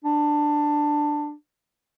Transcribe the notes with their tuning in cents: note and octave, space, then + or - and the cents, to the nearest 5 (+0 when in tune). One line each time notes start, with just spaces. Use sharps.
D4 +10